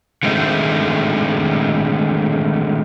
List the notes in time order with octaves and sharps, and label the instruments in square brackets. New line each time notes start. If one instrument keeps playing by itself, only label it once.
[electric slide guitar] D3 D#3 G#3 A3 C4 D#4